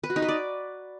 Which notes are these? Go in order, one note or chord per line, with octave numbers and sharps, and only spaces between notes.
B4
F#4
D#4
B4
D5